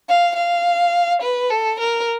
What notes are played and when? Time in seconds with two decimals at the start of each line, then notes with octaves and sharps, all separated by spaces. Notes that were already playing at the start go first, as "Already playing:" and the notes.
0.08 F5
0.36 F5
1.22 B4
1.50 A4
1.79 A#4